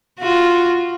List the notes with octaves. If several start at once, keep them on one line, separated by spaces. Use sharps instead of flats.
F4 F#4